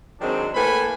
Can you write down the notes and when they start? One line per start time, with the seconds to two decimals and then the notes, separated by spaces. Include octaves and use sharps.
0.21 D#3 F#3 G#3 C4 D4
0.55 A2 A#3 A4 B4 G#5 B5